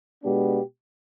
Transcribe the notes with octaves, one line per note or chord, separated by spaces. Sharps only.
B2 G#3 B3 D4 G4